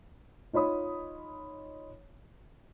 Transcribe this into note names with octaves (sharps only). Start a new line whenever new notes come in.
D#4 F4 C#5 B5 D#6